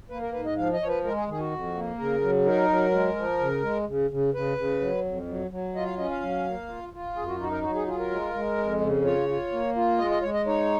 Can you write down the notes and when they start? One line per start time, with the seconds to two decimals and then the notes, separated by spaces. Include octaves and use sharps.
0.10 A#3 B4
0.22 A#4
0.33 G#2 B4
0.46 D#5
0.57 F3 F5
0.73 D#5
0.81 F3 C#5
0.88 B4
1.04 G#3 A#4
1.16 G#4
1.28 D#3 G#4
1.39 F#4
1.51 F2
1.75 A#3
1.98 C#3 A#4
2.22 F#3
2.45 D#4 A#4
2.69 F#3
2.92 G#3
3.16 F3
3.40 C#3
3.63 G#3
3.87 C#3
4.10 C#3
4.34 C#3 B4
4.58 C#3
4.81 F#3
5.05 F2
5.27 F#3
5.51 F#3
5.75 F4 D#5
5.86 F5
5.98 C#4 D#5
6.10 F5
6.22 F#3
6.46 A#3
6.69 F4
6.93 F4
7.16 F#2 G#4
7.27 F#4
7.40 D#4 F#4
7.51 A#4
7.63 F#3 F#4
7.75 G#4
7.87 F4 G#4
7.99 A#4
8.10 G#3
8.34 G#3
8.58 F2
8.81 C#3
9.04 F4 C#5
9.29 F4
9.52 A#3
9.76 F4
9.98 G#3 D#5
10.11 D#5
10.22 G#3 C#5
10.34 D#5
10.46 D#4 C#5